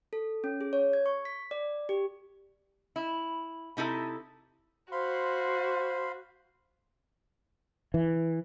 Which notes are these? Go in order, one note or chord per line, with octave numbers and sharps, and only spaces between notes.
A4
C#4
G#4
C#5
G#6
C#6
B6
D5
G4
E4
C3 D#4 E4 A4
F#4 C5 F5 B5 C6
E3